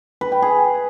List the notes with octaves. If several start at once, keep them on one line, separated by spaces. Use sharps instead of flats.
B4
G5
G#4